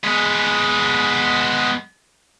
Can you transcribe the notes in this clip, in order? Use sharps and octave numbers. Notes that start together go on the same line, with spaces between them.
G#3 B3